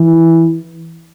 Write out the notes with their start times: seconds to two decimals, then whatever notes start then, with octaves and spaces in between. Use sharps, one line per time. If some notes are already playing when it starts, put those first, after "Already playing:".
Already playing: E3